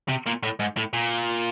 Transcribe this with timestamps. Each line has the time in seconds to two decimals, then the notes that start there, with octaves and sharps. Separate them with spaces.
0.09 C3
0.27 A#2
0.43 A2
0.60 G#2
0.77 A2
0.94 A#2